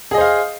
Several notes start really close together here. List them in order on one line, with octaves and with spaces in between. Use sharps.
G#4 D#5 C5 F5